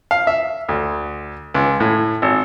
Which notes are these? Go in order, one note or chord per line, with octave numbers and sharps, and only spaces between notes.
F5
E5
D2
C#2
A2
G#1